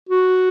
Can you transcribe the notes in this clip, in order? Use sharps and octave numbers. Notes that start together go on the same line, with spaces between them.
F#4